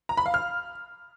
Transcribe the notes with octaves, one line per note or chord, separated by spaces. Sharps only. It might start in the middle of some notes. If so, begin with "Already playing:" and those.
A#5
B5
F5
F6